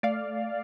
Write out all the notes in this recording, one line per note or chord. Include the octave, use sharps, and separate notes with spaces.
A3 D5 F5